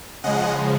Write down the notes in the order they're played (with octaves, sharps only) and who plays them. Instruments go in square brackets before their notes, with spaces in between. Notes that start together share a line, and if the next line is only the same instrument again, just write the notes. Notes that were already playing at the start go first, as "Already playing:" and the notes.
[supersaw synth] C#3 F3 G#3 D#5 F#5